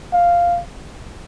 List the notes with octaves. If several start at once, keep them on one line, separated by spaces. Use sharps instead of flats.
F5